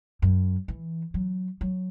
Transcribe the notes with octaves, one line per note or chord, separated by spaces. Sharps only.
F#2
E3
F#3
F#3